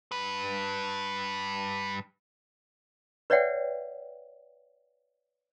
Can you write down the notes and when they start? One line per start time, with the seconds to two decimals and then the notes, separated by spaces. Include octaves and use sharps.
0.12 G2 B4
3.30 B4 C#5 D5 E5 F#5 G5